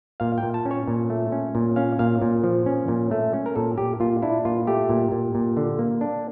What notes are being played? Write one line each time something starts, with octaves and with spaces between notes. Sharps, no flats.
A#2 F5
G5
A#2
A5
C#4
C#5
A#2
A3
C#4
A#2
C#4 F5
A#2 F5
A#2
F3
C#4
A#2
A3
C#4
A#4
A#2 A4
A#2 G4
A#2 F4
D4 E4
A#2 F4
A3 G4
A#2
A#2
A#2
D3
A#3
D4